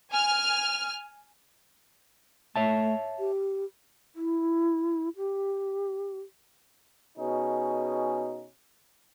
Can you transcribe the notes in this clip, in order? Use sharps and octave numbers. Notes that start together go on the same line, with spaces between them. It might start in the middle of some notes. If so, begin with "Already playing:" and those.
G#5 F6
A3 C#5 E5 A5
G4
E4
G4
B2 C#4 D#4 G#4